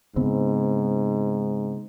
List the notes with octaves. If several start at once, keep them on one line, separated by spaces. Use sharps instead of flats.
G#2 C#3 B3 C4